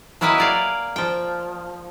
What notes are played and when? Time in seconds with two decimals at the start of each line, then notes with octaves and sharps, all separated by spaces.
0.21 F#3 A#3 E4 B4 D#5 G#5
0.38 A#4 D5 F5
0.96 F3 G5